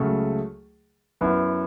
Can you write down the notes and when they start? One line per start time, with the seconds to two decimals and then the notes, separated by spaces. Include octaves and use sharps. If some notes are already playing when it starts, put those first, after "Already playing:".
Already playing: C#2 C#3 F#3 A3
1.21 F#2 F#3 B3 E4 B4